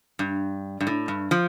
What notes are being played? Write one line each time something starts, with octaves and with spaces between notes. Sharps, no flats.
G2
G2
A2
G2
F3